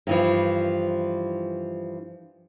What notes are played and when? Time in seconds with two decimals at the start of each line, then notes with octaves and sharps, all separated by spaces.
0.07 G2 E3 F3